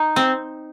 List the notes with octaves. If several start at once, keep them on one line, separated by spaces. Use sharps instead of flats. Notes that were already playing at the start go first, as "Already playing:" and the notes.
Already playing: D#4
C4